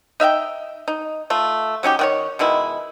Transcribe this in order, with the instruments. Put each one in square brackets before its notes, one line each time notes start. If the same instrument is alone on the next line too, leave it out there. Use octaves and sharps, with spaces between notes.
[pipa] D#4 E5 F5 G5
D#4
A3 F4
F#3 C#4 D#4 G4
D#3 F#4 C#5
B2 D#3 G#3 E4